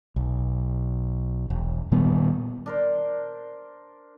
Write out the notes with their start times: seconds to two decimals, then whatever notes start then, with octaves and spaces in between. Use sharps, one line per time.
0.16 B1
1.50 E1
1.92 A#2 D#3 G3 B3
2.66 D4 A#4 C5